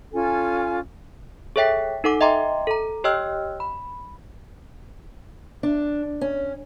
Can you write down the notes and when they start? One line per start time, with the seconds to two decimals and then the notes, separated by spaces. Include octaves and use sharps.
0.13 C#4 F4 A4 G#5
1.56 G#4 A4 C#5 E5 G5 B6
2.04 D#4 A4 F#5 D6
2.21 D#5 E5 G5 A#5 C6 D6
2.67 A4 A#5
3.04 G4 C#5 D#5 G5 E6 F6
3.60 B5
5.63 D4
6.21 C#4